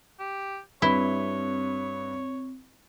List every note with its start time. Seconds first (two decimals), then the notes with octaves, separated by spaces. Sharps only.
0.20 G4
0.82 G2 C4 E4 B4 C#5 G7